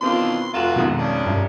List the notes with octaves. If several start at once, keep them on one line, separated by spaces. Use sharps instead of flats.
B2 D#3 E3 C4 D4 F4 C6
F1 F4 F#4 A#5 E7
G#1 F2 G#2 B2
C#4 D4
C2 G2